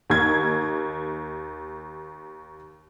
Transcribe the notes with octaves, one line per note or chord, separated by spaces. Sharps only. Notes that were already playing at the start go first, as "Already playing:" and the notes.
D#2 G#6